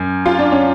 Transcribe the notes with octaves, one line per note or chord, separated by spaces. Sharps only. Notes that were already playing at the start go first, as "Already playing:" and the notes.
Already playing: F#2
F4
D4
C#4